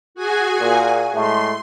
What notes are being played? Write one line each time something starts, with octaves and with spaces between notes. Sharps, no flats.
F#4 G#4 G#5
A#2
A2 G#3 A3 C6